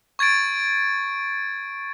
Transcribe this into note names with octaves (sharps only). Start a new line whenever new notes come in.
C#6 G#6 A6 D7